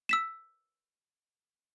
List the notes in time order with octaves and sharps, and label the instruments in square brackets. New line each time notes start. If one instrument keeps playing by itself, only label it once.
[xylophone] E6 B6 E7